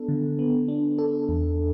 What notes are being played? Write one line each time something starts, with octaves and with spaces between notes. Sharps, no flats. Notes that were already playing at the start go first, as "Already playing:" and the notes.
Already playing: B3 D4 A4
D3
B3
D4
A4
E2